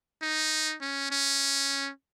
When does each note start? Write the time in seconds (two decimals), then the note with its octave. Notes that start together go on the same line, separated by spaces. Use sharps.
0.22 D#4
0.81 C#4
1.11 C#4